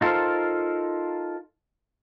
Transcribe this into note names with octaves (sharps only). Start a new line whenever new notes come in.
D#4 F4 A4 A#4 C5